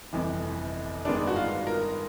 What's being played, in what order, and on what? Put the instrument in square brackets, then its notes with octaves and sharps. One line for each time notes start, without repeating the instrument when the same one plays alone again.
[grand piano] G1 F2 C3 E3
[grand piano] G2 D#3 G#3 B3 D#4 [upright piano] D4
[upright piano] F#4
F4
A#4